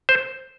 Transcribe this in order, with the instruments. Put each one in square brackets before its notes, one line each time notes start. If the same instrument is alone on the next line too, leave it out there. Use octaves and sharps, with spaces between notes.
[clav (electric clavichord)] C5